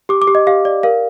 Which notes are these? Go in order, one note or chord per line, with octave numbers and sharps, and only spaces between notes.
G4 D6
D6
G4
D#5
G4 F5
D5
A#4 F5